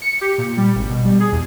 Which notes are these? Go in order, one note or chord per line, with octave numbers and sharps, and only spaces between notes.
C#7
G4
A#2
G3
G#1
B2
G3
G#4
E2